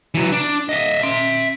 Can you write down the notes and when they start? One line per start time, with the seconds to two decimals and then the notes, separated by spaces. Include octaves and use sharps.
0.15 E3 F#3
0.32 D4
0.69 D#5 E5
1.01 E5 C6